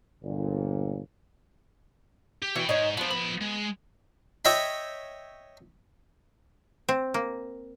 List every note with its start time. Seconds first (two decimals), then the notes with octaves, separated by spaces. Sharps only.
0.23 G1 A#2
2.42 G4
2.56 E3 B3 F#4 C#5 G5
2.69 G#2 D#4 C#5
2.97 F3 B3 D4 C5
3.11 F3 B3 B5
3.41 G#3
4.45 C#5 D#5 E5 G5 B5
6.89 C4
7.14 A#3